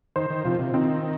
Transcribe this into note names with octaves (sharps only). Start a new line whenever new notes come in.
D#3 C5
D#3
C3 F3 F4
C3
D#3 C4